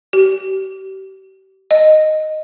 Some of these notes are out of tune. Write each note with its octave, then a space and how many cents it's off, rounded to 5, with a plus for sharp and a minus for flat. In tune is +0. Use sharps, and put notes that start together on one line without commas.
G4 -35
D#5 -5